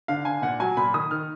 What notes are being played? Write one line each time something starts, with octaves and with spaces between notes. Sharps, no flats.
D3 F5
D3 G#5
A#2 F#5
F#3 G#5
A#2 B5
D#3 D#6
D#3 F6